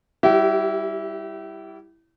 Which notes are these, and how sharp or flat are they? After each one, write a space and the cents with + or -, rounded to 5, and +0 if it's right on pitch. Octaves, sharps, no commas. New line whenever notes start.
G3 +5 E4 +0 G4 -40